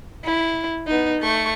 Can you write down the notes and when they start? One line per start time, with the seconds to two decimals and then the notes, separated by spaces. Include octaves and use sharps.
0.24 E4
0.87 B3 D#4
1.21 A3 C#6